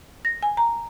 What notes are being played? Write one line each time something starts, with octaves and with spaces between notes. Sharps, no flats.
A#6
G#5
A#5